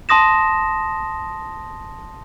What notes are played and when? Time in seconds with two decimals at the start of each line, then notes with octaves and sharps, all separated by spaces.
0.09 A5 C6 D#6 A#6 E7